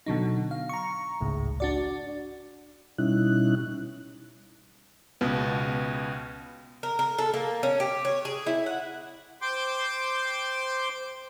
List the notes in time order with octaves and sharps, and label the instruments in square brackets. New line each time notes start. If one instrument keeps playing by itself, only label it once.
[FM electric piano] B2 D3 F#3 D#4
F5
A#5 C#6
G#1 C#2 A2
D4 F#4 D5
[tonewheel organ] B2 G3 C#4 D#4 E4 F#6
[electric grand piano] C#2 B2 B3
[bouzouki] A#4
A#4
A4
A#3
C#4
G4
C#5
G#4
E4
F#5
[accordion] C5 G5 C6 D6